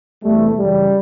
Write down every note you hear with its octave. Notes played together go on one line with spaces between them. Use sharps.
E2 C3 E3 G3 A3
F#2 C#3 E3 G3